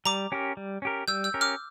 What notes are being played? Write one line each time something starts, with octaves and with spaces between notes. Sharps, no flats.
G3 A#5 D6
C#4 G4 A#4
G3
C#4 G4 A#4
G3 E6 G6
E6 G6
C#4 G4 A#4
D6 F6